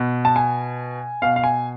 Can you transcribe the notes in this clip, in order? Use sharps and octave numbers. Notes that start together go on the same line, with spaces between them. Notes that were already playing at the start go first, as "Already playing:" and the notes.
Already playing: B2
A5
G#5
B2 F5
F5
G#5